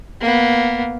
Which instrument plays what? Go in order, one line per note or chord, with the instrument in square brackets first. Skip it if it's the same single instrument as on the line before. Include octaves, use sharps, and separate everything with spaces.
[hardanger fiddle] A#3 B3